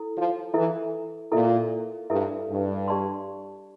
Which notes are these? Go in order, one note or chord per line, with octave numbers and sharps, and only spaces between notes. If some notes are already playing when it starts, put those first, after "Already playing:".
Already playing: E4 A4
F3
E3 E4 A4 E5
A#2 E4 A4 E5
G2 E4 A4 E5
G2
G4 D5 A5 C6